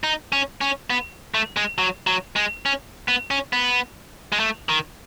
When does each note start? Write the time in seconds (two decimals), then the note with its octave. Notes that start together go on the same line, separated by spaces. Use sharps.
0.04 D#4
0.32 C#4
0.61 C#4
0.90 B3
1.34 A3
1.57 G#3
1.78 F#3
2.07 F#3
2.36 G#3
2.66 C#4
3.08 B3
3.31 C#4
3.53 B3
4.32 G#3
4.40 A3
4.69 D#3